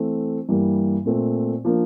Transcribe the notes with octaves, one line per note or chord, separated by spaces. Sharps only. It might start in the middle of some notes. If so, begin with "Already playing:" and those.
Already playing: E3 A3 C4
G2 E3 G3 A#3
A#2 A3 C4
F3 A#3 D4